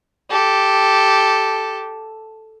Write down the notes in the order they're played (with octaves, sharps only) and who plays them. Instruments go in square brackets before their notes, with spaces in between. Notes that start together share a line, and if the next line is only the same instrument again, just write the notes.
[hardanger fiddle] G4 A4